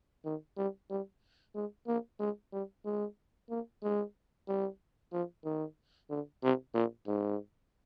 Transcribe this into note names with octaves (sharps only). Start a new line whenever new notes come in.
D#3
G3
G3
G#3
A#3
G#3
G3
G#3
A#3
G#3
G3
F3
D#3
D3
C3
A#2
G#2